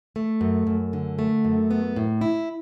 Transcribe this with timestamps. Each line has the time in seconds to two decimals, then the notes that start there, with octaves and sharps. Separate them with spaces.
0.16 A3
0.41 F#2
0.67 F#2
0.93 D3
1.19 A3
1.45 F#2
1.71 B3
1.96 A2
2.21 E4